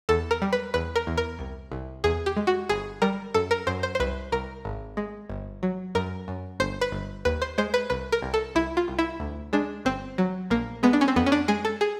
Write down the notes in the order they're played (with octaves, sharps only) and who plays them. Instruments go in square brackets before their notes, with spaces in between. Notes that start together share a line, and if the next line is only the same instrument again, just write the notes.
[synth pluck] E2 A4
A#4
G3
B4
E2 B4
A#4
E2
A#4
C2
C2
E2 G#4
G4
G#3
F#4
G1 G#4
G3 A#4
F#2 A4
A#4
F#2 C5
C5
C5
C2 B4
C2 A#4
G#1
G#3
G1
F#3
F#2 A#4
F#2
G1 C5
B4
G1
D#2 B4
C5
G#3 C5
B4
C2 B4
A#4
C2
A4
C2 E4
F4
C2
E4
D2
G#3 D4
G1 C4
F#3
A#1 A#3
G#3 B3
D4
C#4
C4
F2 B3
C#4
D4
G#3 G#4
A4
G#4